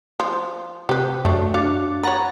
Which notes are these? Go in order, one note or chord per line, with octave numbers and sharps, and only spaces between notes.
F3
C3 G4 B4
F#2 A3 D4
D4 F#4 F5
B4 C#5 F#5 A#5 A6